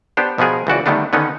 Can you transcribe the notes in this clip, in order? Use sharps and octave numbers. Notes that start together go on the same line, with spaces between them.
B3 D4 G4 C5
B2 F3 B3 G#4 A#4
C#2 E3 F#4 D5
D3 D#3 G3 A3 B3 D4
D3 D#3 B3 C#4 D#4